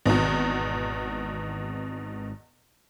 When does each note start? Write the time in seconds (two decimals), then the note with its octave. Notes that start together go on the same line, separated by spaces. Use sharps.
0.06 G#1 E2 B2